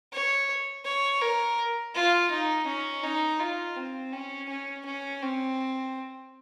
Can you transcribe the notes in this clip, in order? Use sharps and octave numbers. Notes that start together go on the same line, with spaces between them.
C#5
C#5
A#4
F4
D#4
C#4
D#4
F4
C4
C#4
C#4
C#4
C4